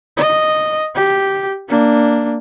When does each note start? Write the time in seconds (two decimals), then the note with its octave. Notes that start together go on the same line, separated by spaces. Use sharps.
0.17 D#5
0.95 G4
1.69 A#3 D4